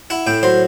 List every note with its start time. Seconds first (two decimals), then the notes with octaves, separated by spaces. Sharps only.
0.10 E4 F#5
0.27 A2 G5
0.43 F#3 C5